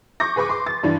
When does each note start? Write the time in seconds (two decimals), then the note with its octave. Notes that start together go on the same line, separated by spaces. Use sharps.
0.20 C#6 D6 G6 A#6
0.36 G#4 B4 B5 C#6 D6
0.49 C6 D6
0.67 A6
0.83 G2 E3 D4